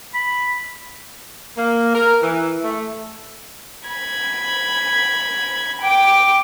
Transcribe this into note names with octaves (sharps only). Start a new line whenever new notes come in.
B5
A#3
A#4
E3
A3
B5 G#6
G5 D6